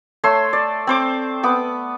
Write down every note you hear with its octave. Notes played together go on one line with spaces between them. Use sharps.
A3 C#5 C6 E6
D5
C4 C5 D6
B3 D6